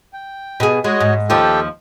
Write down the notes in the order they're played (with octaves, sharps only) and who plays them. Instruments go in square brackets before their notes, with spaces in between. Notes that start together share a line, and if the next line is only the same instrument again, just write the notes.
[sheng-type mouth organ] G5
[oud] B2 G#4
[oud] G#3 [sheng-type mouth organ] F#4 C#5 D#5
[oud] G#2
[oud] D#2 F3 F4 [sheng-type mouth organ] G4 A4 G5